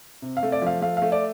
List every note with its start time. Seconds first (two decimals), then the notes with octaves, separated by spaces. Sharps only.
0.22 C3
0.37 F5
0.43 A3
0.52 D5
0.62 F3 F5
0.82 A3 F5
0.97 F5
1.02 A3
1.12 D5